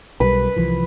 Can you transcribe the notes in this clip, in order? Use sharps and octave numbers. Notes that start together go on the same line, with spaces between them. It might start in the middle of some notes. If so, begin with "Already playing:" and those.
B1 E3 G3 B4
C2 E3 F3